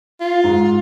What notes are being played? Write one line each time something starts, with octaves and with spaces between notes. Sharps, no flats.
F4
G#2